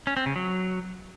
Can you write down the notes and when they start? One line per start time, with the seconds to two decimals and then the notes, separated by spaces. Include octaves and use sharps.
0.07 C#4
0.17 C4
0.26 C#3
0.36 F#3